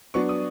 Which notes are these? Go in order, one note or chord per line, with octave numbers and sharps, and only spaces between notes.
F#3 B3 D4 C#6
D#6